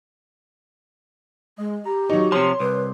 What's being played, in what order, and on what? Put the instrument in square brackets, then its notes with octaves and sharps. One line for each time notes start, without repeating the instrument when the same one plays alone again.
[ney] G#3 [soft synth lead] D#5
[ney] G4 [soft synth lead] A#5
[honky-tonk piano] F#3 D#4 [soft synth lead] C#6
[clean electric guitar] C3 F3 [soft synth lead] C#5 [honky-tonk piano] C6
[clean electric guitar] C2 [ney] B4